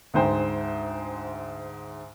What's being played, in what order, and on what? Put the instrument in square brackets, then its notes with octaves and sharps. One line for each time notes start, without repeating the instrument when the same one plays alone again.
[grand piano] D2 G#2 C5 G5